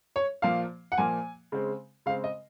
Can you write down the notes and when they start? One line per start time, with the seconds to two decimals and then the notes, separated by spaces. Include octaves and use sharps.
0.16 C#5
0.42 A#2 F3 A#3 F5
0.92 F#5
0.98 A#2 F3 A#3 G#5
1.52 C#3 G#3 C4
2.06 C#3 G#3 C4 F5
2.24 D#5